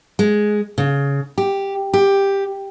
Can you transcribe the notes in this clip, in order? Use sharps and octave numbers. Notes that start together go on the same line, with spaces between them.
G#3
C#3
G4
G4